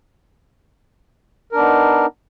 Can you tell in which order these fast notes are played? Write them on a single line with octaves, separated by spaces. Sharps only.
A#4 D4 B3 D#4